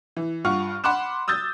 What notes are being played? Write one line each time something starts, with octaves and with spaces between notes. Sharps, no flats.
E3
G2 F4 F#5 C#6 F6
F#5 B5 C6 D6 F#6 E7
D#6 E6 G6 A6